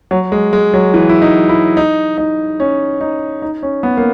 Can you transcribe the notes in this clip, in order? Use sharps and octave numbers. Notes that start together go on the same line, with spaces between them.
F#3
G#3
G#3
F#3
E3
E4
D#4
E4
D#4
D#4
C#4
D#4
D#4
C#4
B3
A#3